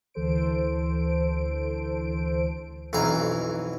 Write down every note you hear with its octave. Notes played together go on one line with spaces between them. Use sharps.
D2 E3 A4 C5 D7
B1 F2 E3 F5 A#5